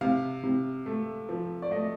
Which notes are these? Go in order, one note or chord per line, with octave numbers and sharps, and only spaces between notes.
C3 F5
C3
A3
F3
D5
A3 D#5